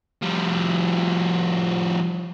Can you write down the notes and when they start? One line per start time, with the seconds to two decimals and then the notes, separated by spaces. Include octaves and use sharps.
0.22 F3 G3